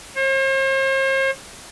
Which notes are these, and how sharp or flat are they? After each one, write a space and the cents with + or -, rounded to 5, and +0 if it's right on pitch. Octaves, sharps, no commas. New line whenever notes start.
C5 +45